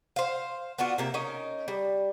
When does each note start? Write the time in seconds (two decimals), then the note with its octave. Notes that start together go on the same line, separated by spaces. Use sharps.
0.16 C5 F5
0.78 B3 D4 F4 F#4
0.98 C3 A#3 E5
1.14 C#4 D#4 A#4
1.68 G3